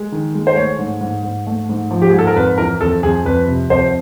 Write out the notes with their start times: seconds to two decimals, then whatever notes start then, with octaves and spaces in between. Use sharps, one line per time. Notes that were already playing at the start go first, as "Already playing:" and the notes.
Already playing: G#3
0.12 D#3
0.35 G#3
0.47 C5
0.56 A3 C#5
0.79 G#2
1.01 G#2
1.23 G#2
1.47 A3
1.69 G#2
1.91 F3
2.02 G4
2.11 G#2 G#4
2.19 A4
2.27 A#4
2.36 F2 B4
2.58 E3 A#4
2.81 F2 A4
3.03 F2 G#4
3.25 F2 B4
3.48 C3
3.70 F2 C5